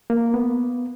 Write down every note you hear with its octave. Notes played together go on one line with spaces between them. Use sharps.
A#3
B3